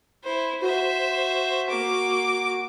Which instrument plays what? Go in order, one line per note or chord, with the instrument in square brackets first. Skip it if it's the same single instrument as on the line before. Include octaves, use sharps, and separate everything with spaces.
[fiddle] E4 C5
[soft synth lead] F#4 [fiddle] C5 E5
[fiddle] A#3 D6